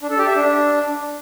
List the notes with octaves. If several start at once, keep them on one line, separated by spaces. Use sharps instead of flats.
D4
A4
G4
E5
D4